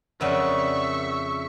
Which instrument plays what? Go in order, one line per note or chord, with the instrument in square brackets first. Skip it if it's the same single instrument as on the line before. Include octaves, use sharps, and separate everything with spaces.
[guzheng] F2 C#3 [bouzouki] A#4 D5 F#5 [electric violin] E5 C#6